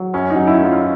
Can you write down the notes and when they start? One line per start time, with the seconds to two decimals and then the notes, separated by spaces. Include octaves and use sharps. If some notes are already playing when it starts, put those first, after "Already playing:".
Already playing: F#3
0.14 F#2 C#4
0.30 D#4
0.36 F#3
0.47 E4
0.59 A3
0.64 F4